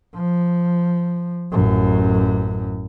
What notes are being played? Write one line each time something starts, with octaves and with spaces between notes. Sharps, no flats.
F3
A1 F#2